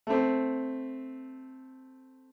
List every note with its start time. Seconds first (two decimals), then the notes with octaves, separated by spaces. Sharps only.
0.07 A3 C4